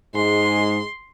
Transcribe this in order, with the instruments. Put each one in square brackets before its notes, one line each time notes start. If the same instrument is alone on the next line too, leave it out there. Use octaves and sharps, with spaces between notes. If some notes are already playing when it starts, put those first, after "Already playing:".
[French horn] G#2 [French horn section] G#3 G#4 [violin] C6